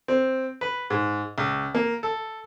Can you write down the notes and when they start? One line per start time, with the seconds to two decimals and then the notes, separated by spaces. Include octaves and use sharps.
0.08 C4
0.61 B4
0.90 G#2
1.38 C#2
1.75 A#3
2.03 A4